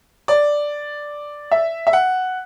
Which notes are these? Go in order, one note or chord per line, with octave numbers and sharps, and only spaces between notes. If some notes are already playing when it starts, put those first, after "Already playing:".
D5
E5
E5
F#5